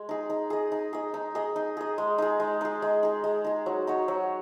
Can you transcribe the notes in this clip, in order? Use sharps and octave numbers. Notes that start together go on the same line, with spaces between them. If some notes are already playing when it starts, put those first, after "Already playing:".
Already playing: G#3
D#4 G#4
D#4
G#4 D#5
D#4
G#4 D#5
D#4
G#4 D#5
D#4
G#4 D#5
G#3
D#4 G#4
G#3
D#4 G#4
G#3
D#4 G#4
G#3
D#4 G#4
F#3
D#4 F#4 C#5
F#3